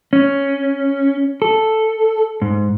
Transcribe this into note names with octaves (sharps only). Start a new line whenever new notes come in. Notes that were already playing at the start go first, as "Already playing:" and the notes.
C#4
A4
G#2